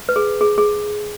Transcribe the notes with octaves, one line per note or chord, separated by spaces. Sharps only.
B4
G#4
G#4
G#4